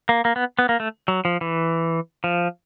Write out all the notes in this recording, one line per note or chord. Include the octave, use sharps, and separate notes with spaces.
A#3
A#3
B3
B3
A#3
A3
F#3
F3
E3
F3